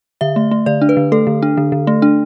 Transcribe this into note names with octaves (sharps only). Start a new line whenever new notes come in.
D3 E5
A3
A3
D3 D5
D4
B4
D3
A3 A4
D3
D4
D3
D3
A3
D4